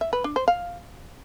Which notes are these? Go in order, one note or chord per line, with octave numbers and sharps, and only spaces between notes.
E5
B4
D4
C5
F5